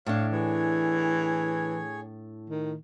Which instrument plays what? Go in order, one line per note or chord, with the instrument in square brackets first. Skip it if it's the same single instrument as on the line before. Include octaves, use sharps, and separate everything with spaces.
[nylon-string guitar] A2 D4 [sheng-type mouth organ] C#5 F5
[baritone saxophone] E3 [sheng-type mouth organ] G#4 C#5
[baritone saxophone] D#3